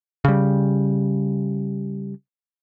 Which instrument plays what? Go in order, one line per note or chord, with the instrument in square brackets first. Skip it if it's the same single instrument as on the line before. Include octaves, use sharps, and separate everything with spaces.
[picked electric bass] C#3 G3